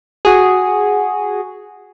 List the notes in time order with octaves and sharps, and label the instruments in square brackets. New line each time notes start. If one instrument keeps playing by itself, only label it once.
[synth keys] F#4 G#4